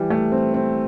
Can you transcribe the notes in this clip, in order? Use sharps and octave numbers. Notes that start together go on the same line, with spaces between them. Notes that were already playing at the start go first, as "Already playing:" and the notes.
Already playing: E3 G3
A3
C4
C4